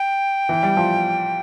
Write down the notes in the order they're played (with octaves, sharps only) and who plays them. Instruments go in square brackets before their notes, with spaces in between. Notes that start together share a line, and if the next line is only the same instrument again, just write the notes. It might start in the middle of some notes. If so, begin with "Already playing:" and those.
Already playing: [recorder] G5
[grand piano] E3
G3
F3